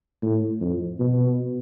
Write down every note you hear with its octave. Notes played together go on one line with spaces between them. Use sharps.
A2
F2
B2